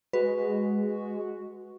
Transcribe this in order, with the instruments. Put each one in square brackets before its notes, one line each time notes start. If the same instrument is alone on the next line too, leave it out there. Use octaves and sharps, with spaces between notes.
[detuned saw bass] G#3 [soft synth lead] F#4 [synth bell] B4